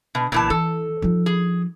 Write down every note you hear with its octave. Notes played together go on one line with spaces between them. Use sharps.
B2
B1 A#2 D3 E3 A5
E3 A4
F3 D#4
G#4